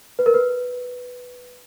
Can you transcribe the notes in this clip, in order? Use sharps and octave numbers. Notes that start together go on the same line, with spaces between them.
B4
A#4
B4